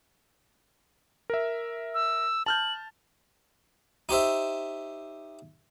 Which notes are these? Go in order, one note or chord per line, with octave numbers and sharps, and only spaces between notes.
A#4 E5
E6
A5 F6 G6 F#7
D#4 G4 C5 E5